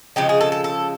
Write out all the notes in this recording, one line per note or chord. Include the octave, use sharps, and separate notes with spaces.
C#3 F3 G#3 G4
G#4
A4
A4
A4